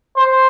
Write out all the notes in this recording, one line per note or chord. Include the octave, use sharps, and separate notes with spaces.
C5